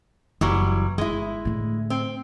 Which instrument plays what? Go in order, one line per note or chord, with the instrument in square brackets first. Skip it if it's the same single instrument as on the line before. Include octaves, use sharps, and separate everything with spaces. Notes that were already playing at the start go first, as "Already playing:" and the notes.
[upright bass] F#1 [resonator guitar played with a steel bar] E3 F#3 G3
[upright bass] G1 [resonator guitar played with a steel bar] G#3 E4
[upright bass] A2 D3
[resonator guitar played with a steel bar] C4